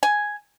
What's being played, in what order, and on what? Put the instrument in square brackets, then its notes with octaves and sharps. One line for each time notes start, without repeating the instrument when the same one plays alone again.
[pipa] G#5